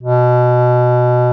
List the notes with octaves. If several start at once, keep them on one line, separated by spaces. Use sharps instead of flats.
B2